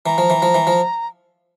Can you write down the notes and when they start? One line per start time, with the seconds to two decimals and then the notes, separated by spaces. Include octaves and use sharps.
0.06 E3 A#5
0.18 F3
0.30 E3
0.42 F3
0.54 E3
0.67 F3